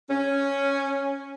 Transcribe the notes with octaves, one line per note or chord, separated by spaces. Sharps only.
C#4